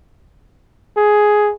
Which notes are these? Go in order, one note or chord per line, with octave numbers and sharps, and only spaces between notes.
G#4